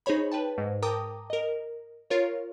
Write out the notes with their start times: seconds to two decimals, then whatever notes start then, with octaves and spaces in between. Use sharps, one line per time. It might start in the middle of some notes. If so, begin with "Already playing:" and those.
0.06 D#4 G#4 C5 C#5 B5
0.32 B4 G5 A5
0.58 G#2
0.82 A#4 G5 A5 A#5 D6 D#6
1.30 A#4 D#5
2.10 F4 A#4 C#5